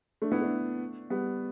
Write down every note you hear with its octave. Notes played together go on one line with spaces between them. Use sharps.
A3 D4
B3 E4
A3 D4
G3 B3